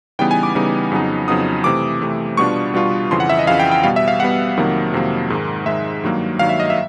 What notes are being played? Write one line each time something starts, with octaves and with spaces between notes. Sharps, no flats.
C#3 E3 G3 B3 D#4 G5
G#5
D6
C#3 E3 G3 B3 D#4
F2 C#3 F#3 B3 D#4
F2 C#3 F#3 B3 D#4 D#6
C3 E3 A3 D6
C3 E3 A3
B2 G3 B3 D4 F4 C#6
B2 G3 B3 D4 F4
F2 C#3 E3 C6
F#5
E5
D#5
F2 C#3 E3 F5
G5
G5
B2 G3 B3 F5
E5
F5
B2 G3 B3 F#5
F2 C3 D#3 F#3 A#3
F2 C3 D#3 F#3 A#3
G#2 D#3 G#3
G#2 D#3 G#3 E5
G2 D#3 F#3 A#3
G2 D#3 F#3 A#3 F5
E5
D#5
E5